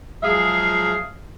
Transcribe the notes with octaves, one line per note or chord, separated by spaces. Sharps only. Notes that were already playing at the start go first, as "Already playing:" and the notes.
F3 F#3 G#3 G#4 E5 F5